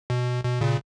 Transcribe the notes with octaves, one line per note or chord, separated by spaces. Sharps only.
B2
B2
A#2 C#3